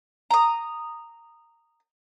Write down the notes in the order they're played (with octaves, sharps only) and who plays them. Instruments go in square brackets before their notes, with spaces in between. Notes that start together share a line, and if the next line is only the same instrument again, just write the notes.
[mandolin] A#5 D#6